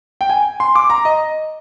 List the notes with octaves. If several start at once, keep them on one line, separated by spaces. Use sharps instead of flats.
G5
G#5
C6
D6
A#5
D#5